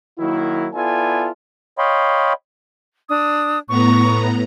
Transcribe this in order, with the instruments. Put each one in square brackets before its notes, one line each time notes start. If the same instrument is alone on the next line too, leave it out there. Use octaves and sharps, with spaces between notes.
[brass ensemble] D#3 F#3 A#3 E4
B3 E4 F4 A4 D5 G#5
[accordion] C#5 D#5 F5 G5 B5 C6
[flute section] D4 D#6
[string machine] A2 B3 A#5 [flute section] C#6